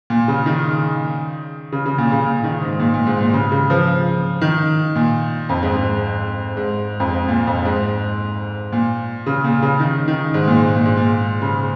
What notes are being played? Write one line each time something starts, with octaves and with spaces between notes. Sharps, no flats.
A#2
C#3
D#3
C#3
C#3
A#2
C#3
A#2
D#3
G#2
A#2
A#2
G#2
A#2
C#3
C#3
F3
D#3
A#2
F2
G#2
G#2
G#2
F2
G#2
A#2
F2
G#2
A#2
C#3
A#2
C#3
D#3
D#3
G#2
A#2
G#2
A#2
G#2
A#2
C#3